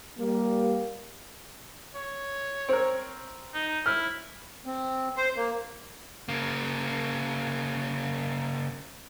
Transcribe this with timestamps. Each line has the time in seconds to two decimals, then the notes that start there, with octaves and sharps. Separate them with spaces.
0.17 G3 A#3
1.95 C#5
2.69 C4 A#4
3.54 D#4
3.86 E4 F6
4.66 C4
5.16 C5
5.36 A#3
6.29 C#3 A#3